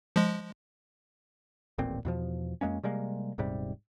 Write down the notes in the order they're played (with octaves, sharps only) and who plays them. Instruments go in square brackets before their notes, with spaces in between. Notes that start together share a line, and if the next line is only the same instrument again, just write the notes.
[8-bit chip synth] F3 G#3
[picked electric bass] D#1 A1 A#2 C4
E2 B2 F3
F2 G#3 A#3 C#4
C3 G3 G#3 A#3
D#1 G#2 C3 G3